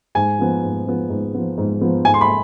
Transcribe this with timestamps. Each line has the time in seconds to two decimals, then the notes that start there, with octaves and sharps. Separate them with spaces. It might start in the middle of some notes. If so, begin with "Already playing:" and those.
0.15 G#2 G#5
0.39 F3 B3
0.63 G#2
0.86 F3 B3
1.10 G#2
1.34 F3 B3
1.57 G#2
1.81 F3 B3
2.05 G#2 G#5
2.14 C6
2.21 B5